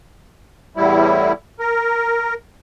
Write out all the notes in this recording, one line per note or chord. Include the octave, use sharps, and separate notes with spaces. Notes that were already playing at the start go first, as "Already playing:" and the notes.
E2 A2 G3 E4
A#4